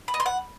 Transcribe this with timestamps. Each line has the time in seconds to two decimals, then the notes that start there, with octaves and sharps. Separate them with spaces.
0.08 B5
0.14 D#5
0.20 C6
0.26 F#5